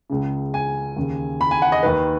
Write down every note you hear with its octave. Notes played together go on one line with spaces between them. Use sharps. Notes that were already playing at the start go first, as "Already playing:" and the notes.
C#2 C#3
G#5
D#2 C#3
B5
G#5
F#5
D#5
D#2 D#3 B4